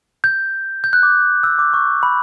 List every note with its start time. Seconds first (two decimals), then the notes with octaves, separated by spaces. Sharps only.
0.24 G6
0.84 G6
0.93 F#6
1.03 D6
1.43 E6
1.59 D6
1.74 C#6
2.03 B5